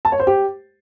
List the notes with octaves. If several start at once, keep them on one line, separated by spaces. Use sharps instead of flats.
A5
C#5
C5
G4